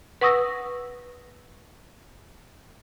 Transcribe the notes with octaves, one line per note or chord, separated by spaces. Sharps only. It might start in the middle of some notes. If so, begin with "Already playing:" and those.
B4 F#5 C#6 D#6 E6 A#6